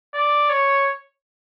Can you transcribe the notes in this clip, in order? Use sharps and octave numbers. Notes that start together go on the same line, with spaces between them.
D5
C#5